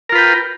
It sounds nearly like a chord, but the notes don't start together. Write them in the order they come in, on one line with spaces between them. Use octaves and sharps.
A#4 F4 B4 G5